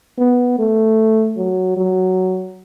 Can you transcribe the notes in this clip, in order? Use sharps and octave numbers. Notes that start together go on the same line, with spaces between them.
B3
A3
F#3
F#3